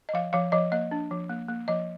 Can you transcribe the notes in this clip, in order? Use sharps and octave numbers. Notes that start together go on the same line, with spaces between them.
D#5
F3 F5
F3 F5
F3 D#5
A#3 D#5
D4
F3
A#3
A#3
F3 D#5